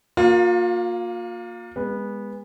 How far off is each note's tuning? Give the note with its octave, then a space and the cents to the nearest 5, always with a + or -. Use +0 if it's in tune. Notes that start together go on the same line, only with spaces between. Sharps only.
A#3 +0 F4 +35
G#3 -30 B3 -15